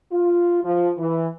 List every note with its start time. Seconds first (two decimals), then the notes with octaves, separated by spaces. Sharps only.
0.12 F4
0.63 F3
0.98 E3